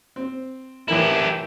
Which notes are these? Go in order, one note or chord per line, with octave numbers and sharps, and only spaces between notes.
C4
A2 E3 E4 G4 A#4